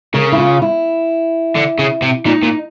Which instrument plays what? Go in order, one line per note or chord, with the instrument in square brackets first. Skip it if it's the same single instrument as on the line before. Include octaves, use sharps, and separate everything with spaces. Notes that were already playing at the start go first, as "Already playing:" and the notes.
[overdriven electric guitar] C#3 [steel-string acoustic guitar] A#4
[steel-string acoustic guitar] E4
F4
E4
[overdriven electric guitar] D3
C#3
C3
[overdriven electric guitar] A#2 [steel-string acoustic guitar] D#4
[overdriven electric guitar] A#2